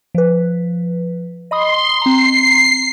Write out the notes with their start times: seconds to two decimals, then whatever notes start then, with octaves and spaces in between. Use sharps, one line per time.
0.15 F3 B4
1.51 D#5 B5 C6 D#6
2.02 C4 A#5 C7